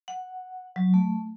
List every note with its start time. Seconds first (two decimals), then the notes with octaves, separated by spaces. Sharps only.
0.08 F#5
0.76 F#3
0.94 A3